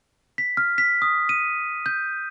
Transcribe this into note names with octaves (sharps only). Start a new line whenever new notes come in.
B6
F6
B6
D#6
D#7
G6